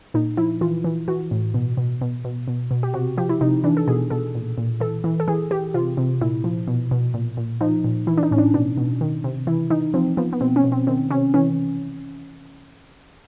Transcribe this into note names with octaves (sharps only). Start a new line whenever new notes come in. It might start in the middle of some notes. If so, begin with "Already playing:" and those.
A#2 D#4
F3 E4
E3 F4
E3
E3 F#4
A2
B2
B2
B2
B2
B2
B2
G4
C3 F#4
F3 G4
E4
C3 D#4
E3 D4
A4
B2 G#4
B2 A4
A#2
A#2
E3 A4
E3
A4
E3 G#4
E3 G4
C3 F4
C3
A#2 E4
F3
B2
B2
A#2
A#2
F3 D#4
A#2
E3 E4
D4
D#4
A2 C#4
D4
B2 D4
B2
D#3
C3
E3 E4
E3 D#4
F3 C4
F3 B3
B3
B2 C4
C#4
B2
C4
D#3 C4
C3 C#4
E3 C#4